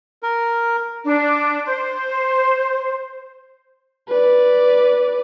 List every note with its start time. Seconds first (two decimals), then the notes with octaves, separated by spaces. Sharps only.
0.23 A#4
1.06 D4
1.65 C5
4.08 B4 D5